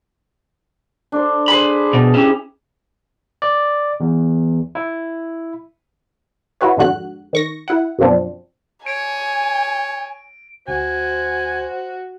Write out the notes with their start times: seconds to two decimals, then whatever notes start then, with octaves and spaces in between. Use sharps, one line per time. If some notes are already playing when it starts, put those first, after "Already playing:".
1.12 D4 A4 C5
1.48 G#4 C5 B5
1.93 B2
2.14 C#4 E4 G4 G#4
3.42 D5
4.00 E2
4.75 E4
6.61 E4 F#4 B4 C#5
6.77 F2 G#2 D3 F#4 F#6
7.33 D#3 C#6 A#6
7.68 E4 F#5
7.99 F#2 B2 F3 C4 D4
8.86 C#5 G#5 D7
10.68 D2 F#4 C5 G#5